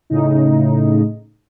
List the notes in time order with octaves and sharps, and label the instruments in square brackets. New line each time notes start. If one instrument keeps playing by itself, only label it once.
[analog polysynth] A2 C#3 D#4